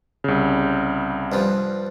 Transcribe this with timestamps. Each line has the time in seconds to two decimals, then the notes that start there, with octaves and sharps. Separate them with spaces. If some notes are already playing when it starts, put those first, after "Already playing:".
0.24 C2 C#3
1.32 G2 F3